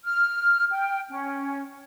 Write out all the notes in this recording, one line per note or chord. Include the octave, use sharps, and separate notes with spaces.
F6
G5
C#4